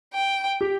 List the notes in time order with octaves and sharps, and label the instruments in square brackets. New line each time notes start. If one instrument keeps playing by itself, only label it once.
[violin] G5
[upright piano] G4